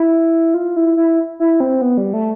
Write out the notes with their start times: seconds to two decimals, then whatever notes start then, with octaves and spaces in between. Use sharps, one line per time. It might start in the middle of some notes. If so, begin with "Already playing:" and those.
Already playing: E4
0.54 F4
0.76 E4
0.97 E4
1.40 E4
1.60 C4
1.82 B3
1.98 G3
2.14 A3